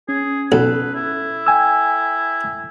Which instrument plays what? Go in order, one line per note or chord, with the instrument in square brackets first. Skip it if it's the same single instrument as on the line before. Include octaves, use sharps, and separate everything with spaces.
[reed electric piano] C#4 [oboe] G#4
[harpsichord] B1 [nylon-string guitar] A4 [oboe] B4
[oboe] E4
[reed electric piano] G5 G#5 E6